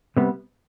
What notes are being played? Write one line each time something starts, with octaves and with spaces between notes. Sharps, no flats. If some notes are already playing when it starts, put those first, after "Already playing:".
C3 G3 B3